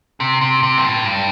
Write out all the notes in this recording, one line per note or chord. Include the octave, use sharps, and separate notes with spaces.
C3
C3
C3
G2
A2
G2